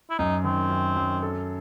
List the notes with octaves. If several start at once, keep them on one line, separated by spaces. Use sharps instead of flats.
E4
F#2 D#4
D#3 C4
F#2
F#2
A4